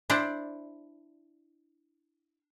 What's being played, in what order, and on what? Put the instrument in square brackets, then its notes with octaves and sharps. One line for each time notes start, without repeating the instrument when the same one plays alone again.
[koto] D4 E4 C5 D5